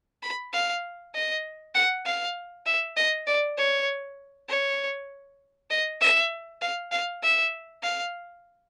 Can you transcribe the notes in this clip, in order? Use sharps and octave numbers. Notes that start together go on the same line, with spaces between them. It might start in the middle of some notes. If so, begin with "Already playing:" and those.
B5
F5
D#5
F#5
F5
E5
D#5
D5
C#5
C#5
D#5
E5
F5
F5
E5
F5